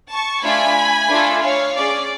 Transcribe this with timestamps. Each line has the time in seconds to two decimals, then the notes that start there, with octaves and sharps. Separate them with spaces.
0.11 A5 C#6
0.43 A3 D4 F4 G#5 B5
1.09 A3 D4 F4 A4
1.42 C#5 F5
1.75 C#4 G#4 D5